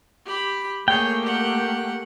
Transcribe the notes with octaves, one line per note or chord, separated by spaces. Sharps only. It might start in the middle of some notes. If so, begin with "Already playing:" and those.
G4 B5
A3 A#3 G#4 C#5 G5
G4 F#5